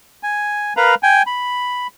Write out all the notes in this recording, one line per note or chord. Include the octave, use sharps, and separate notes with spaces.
G#5
A#4 B4 F5 A#5 B5
G5 G#5
B5